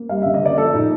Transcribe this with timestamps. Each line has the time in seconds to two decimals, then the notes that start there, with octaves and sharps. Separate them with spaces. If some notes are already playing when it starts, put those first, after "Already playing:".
Already playing: A#3
0.09 G3 F5
0.22 D3 E5
0.34 D#5
0.42 A#3 D5
0.58 F3 A4
0.74 A#2 D#4